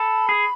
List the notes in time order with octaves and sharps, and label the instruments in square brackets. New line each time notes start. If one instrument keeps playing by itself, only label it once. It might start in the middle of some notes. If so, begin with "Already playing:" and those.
Already playing: [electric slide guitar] A4 [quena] B5
[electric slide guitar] G#4